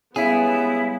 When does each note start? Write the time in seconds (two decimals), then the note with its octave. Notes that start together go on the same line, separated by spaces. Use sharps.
0.16 C#3 G3 G#3 B3 E4 G#4